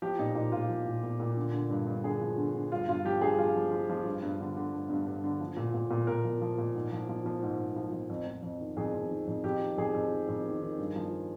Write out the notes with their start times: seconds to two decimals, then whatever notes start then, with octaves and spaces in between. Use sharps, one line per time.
0.02 F3 G4
0.19 A#2 D#4
0.35 A#2 D#4
0.52 A#2 F4
0.69 F3
0.86 A#2
1.04 A#2
1.20 A#2
1.37 D3
1.53 D3
1.70 G2
1.87 G2
2.04 D3 G#4
2.21 F3
2.38 D3
2.55 D3
2.72 G2 F4
2.88 G2 F4
3.05 F3 G4
3.21 G2 G#4
3.38 F3 F4
3.56 F3
3.72 F3
3.90 F3
4.06 G2
4.22 G2
4.40 D3
4.57 D3
4.74 G2
4.89 G2
5.06 G2
5.24 D3
5.41 F3
5.57 A#2
5.74 A#2
5.91 A#2
6.07 A#2 A#4
6.25 F3
6.42 F3
6.58 A#2
6.75 G#2
6.92 F3
7.09 F3
7.26 F3
7.43 G#2
7.59 G#2
7.76 F3
7.93 F3
8.10 F2
8.27 F2
8.43 F2
8.61 D#3
8.77 F2 G#4
8.94 F2
9.11 D#3
9.28 F2
9.44 F2 G4
9.62 D#3
9.78 F2 G#4
9.95 F2
10.12 D#3
10.28 F2
10.45 D#3
10.62 D#3
10.78 G2
10.96 F3